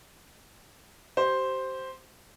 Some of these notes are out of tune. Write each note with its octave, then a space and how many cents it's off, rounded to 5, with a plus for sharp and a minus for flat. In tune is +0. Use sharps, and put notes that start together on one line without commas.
G4 -35 C5 +0